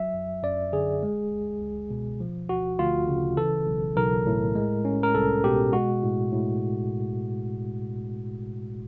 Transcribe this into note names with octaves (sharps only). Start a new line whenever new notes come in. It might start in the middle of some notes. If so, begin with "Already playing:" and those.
Already playing: F#3 E5
F#2
F#2 D5
D3 G#4
G#3
C#2
C#2
B2
F3
D2 F#4
D2 F4
C#3
E3 A4
B1
B1 A#4
A2
G#3
C#4
A#4
C2 A4
B2 G4
G#3 F#4
A2
A2